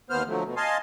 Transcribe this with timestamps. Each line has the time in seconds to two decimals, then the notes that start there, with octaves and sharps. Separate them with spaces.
0.10 D#2 B3 C5 F6
0.27 D3 F3 F#3 A3
0.44 B2
0.57 D#5 F5 G#5 A5 C6